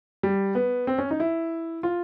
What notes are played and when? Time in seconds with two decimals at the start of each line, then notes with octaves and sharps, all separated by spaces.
0.23 G3
0.55 B3
0.87 C4
0.98 C#4
1.11 D#4
1.20 E4
1.83 F4